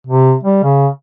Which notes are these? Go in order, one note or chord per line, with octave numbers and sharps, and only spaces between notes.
C3
G3
C#3